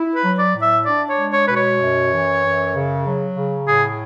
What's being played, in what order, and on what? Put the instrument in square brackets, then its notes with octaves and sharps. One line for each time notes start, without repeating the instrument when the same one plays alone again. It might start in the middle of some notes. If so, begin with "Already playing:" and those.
Already playing: [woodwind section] E4
[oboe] B4
[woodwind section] F#3
[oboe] D5
[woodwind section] A2
[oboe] E5
[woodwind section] D4 [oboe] D5
[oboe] C#5
[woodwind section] G#3
[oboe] C#5
[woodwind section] B2 [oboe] B4
[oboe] C#5
[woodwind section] F#2
E3
F#2
C#3
F#3
C#3
[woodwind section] A2 [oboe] G#4